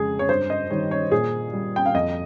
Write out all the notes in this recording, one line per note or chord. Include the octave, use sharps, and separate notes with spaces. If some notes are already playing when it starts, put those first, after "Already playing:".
Already playing: F2 C#3 G#3 G#4
C#5
G2 C5
D#5
D#3 G3 C#5
C#5
A#2 G#4
G3
G5
F5
F2 D#5